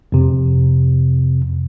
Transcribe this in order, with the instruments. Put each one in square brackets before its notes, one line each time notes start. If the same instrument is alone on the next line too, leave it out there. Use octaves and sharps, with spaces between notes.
[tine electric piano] F2 C3